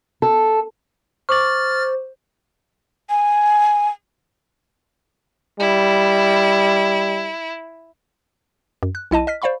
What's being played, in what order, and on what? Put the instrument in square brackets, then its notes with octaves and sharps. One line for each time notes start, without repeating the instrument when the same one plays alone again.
[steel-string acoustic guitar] A4
[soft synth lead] C5 [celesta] C#6 D6 F#7 [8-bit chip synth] F6 A6
[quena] G#5
[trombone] G3 [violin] E4
[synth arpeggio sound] F#2
F#6
B1 E4 D#5 A5 D#7
D#5 F6 B6
C5 D5 F5 B5 C#6